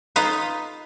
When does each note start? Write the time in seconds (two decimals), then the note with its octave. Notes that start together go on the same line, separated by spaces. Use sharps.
0.16 D#4 F4 B4 F5